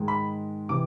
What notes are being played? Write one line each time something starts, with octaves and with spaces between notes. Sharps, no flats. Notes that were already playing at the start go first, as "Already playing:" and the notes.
Already playing: G#2 D#3 G#3
B5
C3 E3 D6